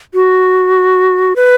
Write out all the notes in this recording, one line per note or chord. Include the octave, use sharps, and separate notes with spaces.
F#4
B4